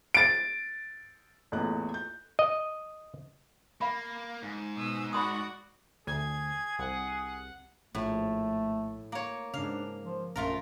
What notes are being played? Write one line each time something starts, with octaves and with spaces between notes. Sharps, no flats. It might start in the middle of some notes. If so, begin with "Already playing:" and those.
A6 D7
A1 E2 A#2 A3 D#5 F#6
G6
D#5
A#3 F5 B5
G#2
B2 D#6 E6
F#4 D5 F#5 B5 C6 D#6
D2 G#4 G#6
C2 F#5
A#1 A2 A3
A#3 C#5
G#2 C#3 D4 F5
F3
A#1 F#2 A#2 A3 F4 A#4